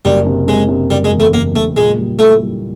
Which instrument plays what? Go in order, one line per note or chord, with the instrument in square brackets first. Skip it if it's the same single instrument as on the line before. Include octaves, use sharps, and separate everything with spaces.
[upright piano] F#1 [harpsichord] G3
[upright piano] C3
[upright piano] C3 [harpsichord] G#3
[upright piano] C3
[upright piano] F#1 [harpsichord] G3
[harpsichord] G#3
[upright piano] E2
[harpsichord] A3
[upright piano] F#1 [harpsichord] A#3
[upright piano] F#1 [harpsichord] A3
[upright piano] A#2 [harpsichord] G#3
[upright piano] G3
[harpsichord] A3 [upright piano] E4
[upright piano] G3